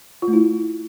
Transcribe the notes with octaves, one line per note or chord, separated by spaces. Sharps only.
F4
A3
E4